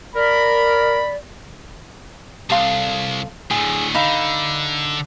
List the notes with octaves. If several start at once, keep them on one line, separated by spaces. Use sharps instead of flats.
A#4 D5 B5
C2 A4 F5 C6
A2 D3 G#4
D3 D#4 F5 B5